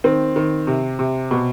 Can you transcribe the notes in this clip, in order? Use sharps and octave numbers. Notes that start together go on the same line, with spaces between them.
D#3 C4
D#3
C3
C3
B2